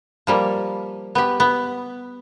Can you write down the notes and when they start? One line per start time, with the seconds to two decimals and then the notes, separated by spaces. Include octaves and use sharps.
0.27 F3 G3 A#3
1.15 B3 G4
1.40 B3